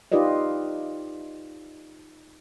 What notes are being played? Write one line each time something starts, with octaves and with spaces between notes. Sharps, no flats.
D#4 F4 G4 B4 D5 D#5